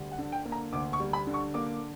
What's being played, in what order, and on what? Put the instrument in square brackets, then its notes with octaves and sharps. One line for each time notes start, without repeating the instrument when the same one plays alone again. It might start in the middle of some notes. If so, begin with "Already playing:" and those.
Already playing: [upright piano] D2 G3
F#5
D3
G5
A#3
A#5
D2 D6
C#6
G3
B5
D3
C#6
A#3 D6